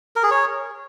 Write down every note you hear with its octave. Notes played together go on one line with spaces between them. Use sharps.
A#4
G#4
C#5